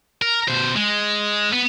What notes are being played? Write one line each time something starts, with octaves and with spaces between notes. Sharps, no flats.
A#4
B2 C5
G#3
B3